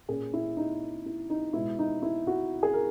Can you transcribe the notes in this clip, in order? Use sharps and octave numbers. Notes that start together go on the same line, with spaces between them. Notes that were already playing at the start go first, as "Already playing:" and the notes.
A#2 A#3 C#4 G#4
E4
D#4
E4
D#4
B2 G#3 B3 E4
D#4
E4
F#4
G#4
A#4